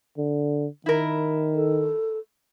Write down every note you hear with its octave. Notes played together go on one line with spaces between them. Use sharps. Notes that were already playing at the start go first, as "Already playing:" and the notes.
D3
D#3 E4 A#4
A4